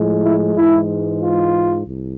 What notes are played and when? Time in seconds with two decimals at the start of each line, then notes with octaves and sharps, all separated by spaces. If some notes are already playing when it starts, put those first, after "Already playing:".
Already playing: A2 F3 G#3
0.24 E4
0.57 G#2 E3 G#3 E4
1.22 F4
1.87 C2